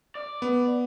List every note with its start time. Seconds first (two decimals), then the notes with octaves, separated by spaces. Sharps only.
0.15 D5
0.42 B3